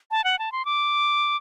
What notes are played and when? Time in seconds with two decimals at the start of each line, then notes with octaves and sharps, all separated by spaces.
0.11 A5
0.24 F#5
0.39 A5
0.52 C6
0.65 D6